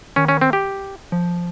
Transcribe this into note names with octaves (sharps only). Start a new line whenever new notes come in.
D#3 C#4
C#4
C4
G4
F3